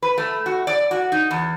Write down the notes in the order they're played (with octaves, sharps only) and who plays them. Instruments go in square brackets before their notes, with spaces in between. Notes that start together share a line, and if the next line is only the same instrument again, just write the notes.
[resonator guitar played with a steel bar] B4
A3
F#4
D5
F#4
D#4
E2